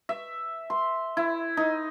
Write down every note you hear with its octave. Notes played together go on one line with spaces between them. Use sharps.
E5
C6
E4
D#4